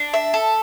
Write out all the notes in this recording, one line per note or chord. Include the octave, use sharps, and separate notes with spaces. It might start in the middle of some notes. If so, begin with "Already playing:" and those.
Already playing: D4
E5
A4